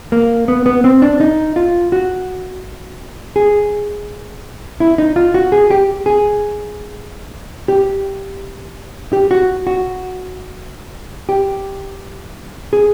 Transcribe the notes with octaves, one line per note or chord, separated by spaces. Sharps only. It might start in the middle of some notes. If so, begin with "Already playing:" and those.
A#3
B3
B3
C4
D4
D#4
F4
F#4
G#4
E4
D#4
F4
F#4
G#4
G4
G#4
G4
G4
F#4
F#4
G4
G#4